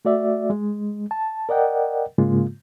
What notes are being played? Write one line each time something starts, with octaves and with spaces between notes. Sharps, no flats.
A3 F#4 D5 E5
G#3
A5
A#4 D5 D#5 F#5 G5
G#2 C#3 G#3 A#3 F4